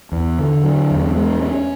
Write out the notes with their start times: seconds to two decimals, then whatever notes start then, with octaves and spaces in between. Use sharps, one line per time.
0.12 E2
0.39 D3
0.64 F#3
0.90 E2
1.16 G#3
1.42 C#4